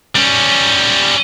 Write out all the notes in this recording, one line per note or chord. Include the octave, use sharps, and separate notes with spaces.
G3 C#4